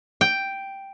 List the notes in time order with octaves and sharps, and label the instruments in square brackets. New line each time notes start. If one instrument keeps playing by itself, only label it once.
[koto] G5